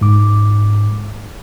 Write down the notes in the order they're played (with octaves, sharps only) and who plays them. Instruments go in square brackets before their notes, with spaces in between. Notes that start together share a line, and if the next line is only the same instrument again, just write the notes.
[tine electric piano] G#2 D6